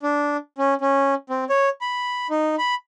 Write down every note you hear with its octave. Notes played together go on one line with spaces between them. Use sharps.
D4
C#4
C#4
C4
C#5
B5
D#4
B5